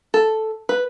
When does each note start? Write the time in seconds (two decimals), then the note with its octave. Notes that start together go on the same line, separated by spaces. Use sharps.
0.14 A4
0.69 B4